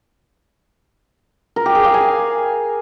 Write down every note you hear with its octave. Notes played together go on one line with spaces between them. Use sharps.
A#4
G4
G#4
F5
G#5